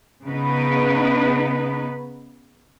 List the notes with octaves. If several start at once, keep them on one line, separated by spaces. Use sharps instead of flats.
C#3 B3 D#4 B4